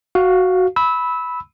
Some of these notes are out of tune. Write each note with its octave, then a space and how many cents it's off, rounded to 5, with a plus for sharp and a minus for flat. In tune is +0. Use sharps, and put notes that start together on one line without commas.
F#4 +0 F5 +5
B5 +0 E6 -20